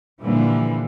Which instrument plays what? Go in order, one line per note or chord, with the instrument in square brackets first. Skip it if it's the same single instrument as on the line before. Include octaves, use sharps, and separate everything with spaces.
[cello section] A#2 D3 E3 F3 G3